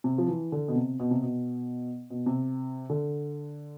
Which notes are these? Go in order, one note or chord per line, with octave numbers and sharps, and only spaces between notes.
C3
F3
E3
D3
B2
C3
B2
C3
B2
B2
C3
D3